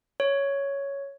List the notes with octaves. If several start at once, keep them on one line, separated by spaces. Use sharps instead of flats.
C#5